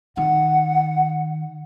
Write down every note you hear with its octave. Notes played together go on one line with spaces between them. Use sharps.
D#3 F#5